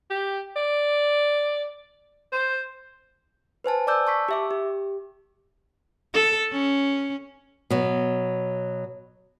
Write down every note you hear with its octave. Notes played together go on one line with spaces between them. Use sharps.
G4
D5
C5
B4 C5 G#5 A5
D5 A5 D6 E6 G6
A5 C#6 B6
G4 E5 D6
G4
A4
C#4
B2 F#3